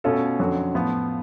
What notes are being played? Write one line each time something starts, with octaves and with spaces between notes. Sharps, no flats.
B2 A3 C#4 F4 A4
F2 D3 F#3 C#4 F#4
A2 F3 B3 F4